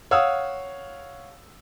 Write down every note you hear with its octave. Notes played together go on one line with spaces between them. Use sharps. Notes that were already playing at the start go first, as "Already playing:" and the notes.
C#5 F5 F#5 D#6 E6